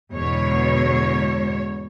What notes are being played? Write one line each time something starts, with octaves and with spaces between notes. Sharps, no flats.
E2 G#2 B2 D3 C#5